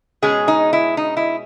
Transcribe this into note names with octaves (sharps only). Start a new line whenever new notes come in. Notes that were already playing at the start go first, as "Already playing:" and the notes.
B2 G#3 C#4 G#4
D#4
E4
D#4
E4